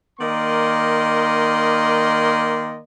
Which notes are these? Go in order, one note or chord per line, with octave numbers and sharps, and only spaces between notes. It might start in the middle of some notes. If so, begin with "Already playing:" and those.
D#3 A#3 D5 D#5 C6